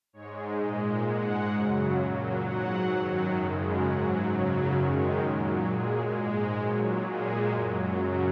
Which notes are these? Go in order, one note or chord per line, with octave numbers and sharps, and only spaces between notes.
G#2 G#3 C#5
A#2 G#3 D#5
G#2 G#3 F#5
F#2 C#3 F#3
A#2 F#3
G#2 F#3 F#5
F#2 D#3 F#3
F#2 C#3 G#3
G#2 F#3 F#5
F#2 C#3 F#3
F#2 D#3 G#3 C#5
A#2 F#3 A#4
A#2 G#3 G#4
G#2 G#3
A#2 F#3 C#5
A#2 G#3 G#4
F#2
F#3
F#2 C#3 F#3